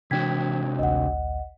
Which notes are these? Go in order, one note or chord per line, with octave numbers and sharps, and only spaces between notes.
C3 E3 D4 F#4 G5 G#6 B6
A1 D2 D#5 F#5